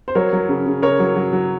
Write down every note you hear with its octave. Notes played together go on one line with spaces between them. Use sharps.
C5
F#3 A#4 C#5
F#3
C#3
C#3
C#3 A#4 C#5
F#3
F#3
F#3